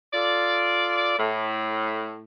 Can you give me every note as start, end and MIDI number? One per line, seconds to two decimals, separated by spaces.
0.13 1.14 65
0.13 1.14 69
0.13 1.14 74
1.18 2.23 45